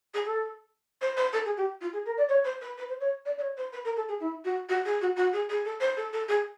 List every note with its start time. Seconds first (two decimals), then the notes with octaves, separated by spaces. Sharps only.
0.14 G#4
0.25 A4
1.01 C5
1.16 C5
1.33 A4
1.45 G#4
1.57 G4
1.81 F4
1.93 G#4
2.05 A#4
2.17 D5
2.29 C#5
2.44 C5
2.61 B4
2.77 B4
2.88 C5
3.00 C#5
3.25 D5
3.37 D5
3.41 C#5
3.57 C5
3.72 B4
3.84 A#4
3.96 A4
4.08 G#4
4.20 E4
4.44 F#4
4.69 F#4
4.85 G#4
5.01 F#4
5.16 F#4
5.33 G#4
5.49 G#4
5.65 A4
5.80 C5
5.96 A4
6.13 A4
6.28 G#4